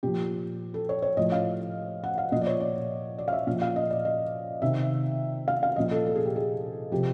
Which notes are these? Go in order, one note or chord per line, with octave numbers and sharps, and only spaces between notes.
A#2 F3 G4
A4
C#5
C#5
A2 F3 D#5
F5
F#5
F5
A#2 F3 D#5
D5
C#5
D5
D5
F5
E5
A#2 F3 F5
F5
D#5
D5
D#5
C3 D#3 E5
F5
F5
A#2 F3 D#5
A4
A4
G#4
G4
G#4
C3 F3 G4